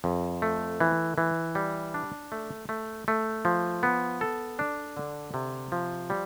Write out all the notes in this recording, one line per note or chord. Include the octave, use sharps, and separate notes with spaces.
F2
A3
E3
E3
G3
D4
A3
A3
A3
F3
B3
A4
D4
D3
C3
F3
G3